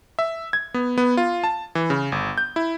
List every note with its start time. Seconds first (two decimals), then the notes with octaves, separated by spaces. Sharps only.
0.19 E5
0.53 G#6
0.74 B3
0.98 B3
1.17 F4
1.44 A5
1.75 E3
1.90 C#3
2.12 G1
2.38 G6
2.56 E4